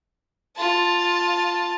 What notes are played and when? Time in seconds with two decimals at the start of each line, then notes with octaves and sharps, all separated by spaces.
0.56 F4 A5